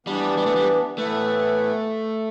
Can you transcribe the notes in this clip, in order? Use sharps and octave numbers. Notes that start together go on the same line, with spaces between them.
E3 G3 B3 D4
G3
A3
G3
A2 E3 A3 B3 E4 B4